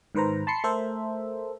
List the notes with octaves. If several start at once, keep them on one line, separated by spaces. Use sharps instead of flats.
G#2 D#3 B4 C5 A#5
A5 B5 C6 C7 C#7
A3 A4 A#4 C5 E5